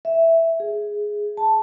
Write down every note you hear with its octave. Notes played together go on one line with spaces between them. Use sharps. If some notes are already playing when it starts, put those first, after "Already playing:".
E5
G#4
A5